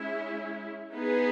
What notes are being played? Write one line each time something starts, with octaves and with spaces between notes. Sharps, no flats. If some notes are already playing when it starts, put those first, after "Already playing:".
Already playing: G#3 C#4 E4
B3 D#4 G#4 B4